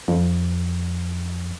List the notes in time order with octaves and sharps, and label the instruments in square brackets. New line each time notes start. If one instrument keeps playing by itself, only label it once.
[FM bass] F2